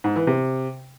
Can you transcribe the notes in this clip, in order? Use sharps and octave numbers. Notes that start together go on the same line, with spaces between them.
G#2
E3
C3